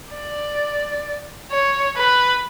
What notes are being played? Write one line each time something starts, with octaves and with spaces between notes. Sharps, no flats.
D5
C#5
B4